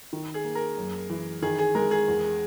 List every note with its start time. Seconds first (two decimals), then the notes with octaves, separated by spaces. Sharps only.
0.13 D#3
0.34 G#4
0.45 A#3
0.55 A#4
0.77 F#2
1.10 E3
1.42 D#3 G#4
1.59 G#4
1.75 G#3 A#4
1.91 G#4
2.08 E2